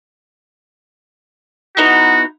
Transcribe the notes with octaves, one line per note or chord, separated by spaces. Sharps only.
B3 D#4 E4 F#4